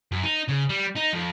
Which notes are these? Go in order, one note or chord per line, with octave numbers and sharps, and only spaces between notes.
F#2
D#4
C#3
G3
D#4
F2